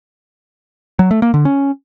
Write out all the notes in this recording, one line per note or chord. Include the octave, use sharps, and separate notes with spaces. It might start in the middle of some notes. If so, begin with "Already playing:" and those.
F#3
A3
A#3
D3
C#4